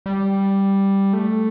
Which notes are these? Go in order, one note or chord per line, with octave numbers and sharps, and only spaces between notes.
G3
A3